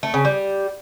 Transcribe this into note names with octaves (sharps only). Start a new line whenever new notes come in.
A3
C#3
G3